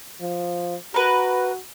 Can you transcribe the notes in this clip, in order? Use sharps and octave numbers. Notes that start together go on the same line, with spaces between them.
F3
F#4 A#4 B4